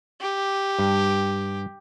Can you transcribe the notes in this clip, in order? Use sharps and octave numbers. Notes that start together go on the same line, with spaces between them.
G4
G2